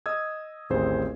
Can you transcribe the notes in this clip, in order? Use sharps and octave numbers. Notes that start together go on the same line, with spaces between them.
D#5 D#6 E6 G#6
A1 D#2 C4 G#4 C5